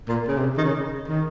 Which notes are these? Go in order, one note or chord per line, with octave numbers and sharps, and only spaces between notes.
A#2
C#3
C3
D#3
C#3
D#3